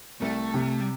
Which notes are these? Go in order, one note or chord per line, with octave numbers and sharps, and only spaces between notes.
C2 A3
C3
G3